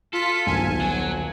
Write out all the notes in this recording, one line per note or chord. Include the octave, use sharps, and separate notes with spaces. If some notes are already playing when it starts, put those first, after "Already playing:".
F4 A4 B6
D#1 B1 G#5
F#3